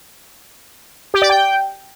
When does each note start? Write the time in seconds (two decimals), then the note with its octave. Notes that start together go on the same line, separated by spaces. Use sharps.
1.14 G4
1.22 D5
1.30 G5